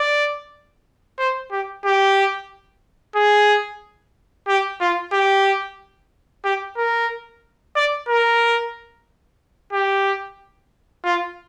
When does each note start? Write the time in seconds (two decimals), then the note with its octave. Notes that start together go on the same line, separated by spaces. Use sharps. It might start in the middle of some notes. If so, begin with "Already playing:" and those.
Already playing: D5
1.18 C5
1.51 G4
1.85 G4
3.16 G#4
4.48 G4
4.80 F4
5.12 G4
6.44 G4
6.77 A#4
7.76 D5
8.09 A#4
9.73 G4
11.05 F4